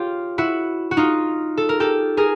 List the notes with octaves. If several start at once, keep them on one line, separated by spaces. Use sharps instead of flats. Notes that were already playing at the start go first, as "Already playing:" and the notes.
Already playing: F4 G4 C#5
E4 F#4
F#4
D#4 F4
A4
A#4
G4 A4
G#4 A#4